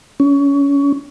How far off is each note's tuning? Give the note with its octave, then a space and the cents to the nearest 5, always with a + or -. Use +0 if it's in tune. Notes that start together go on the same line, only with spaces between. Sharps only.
C#4 +25